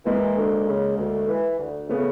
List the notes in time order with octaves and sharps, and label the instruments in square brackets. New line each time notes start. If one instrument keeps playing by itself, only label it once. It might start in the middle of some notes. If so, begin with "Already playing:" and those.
[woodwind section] E3 [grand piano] G#3 A#3
[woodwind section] D2
C#3
D2
E3
D2
[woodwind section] C#3 [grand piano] A3 B3